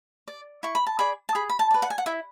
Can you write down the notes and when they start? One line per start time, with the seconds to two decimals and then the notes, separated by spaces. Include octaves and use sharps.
0.28 D5
0.63 E4 C#6
0.75 B5
0.87 A5
0.99 G#4 D5 B5
1.29 A5
1.35 G#4 B5
1.50 B5
1.59 A5
1.71 B4 D5
1.82 F#5
1.90 G#5
1.98 F#5
2.06 E4 E5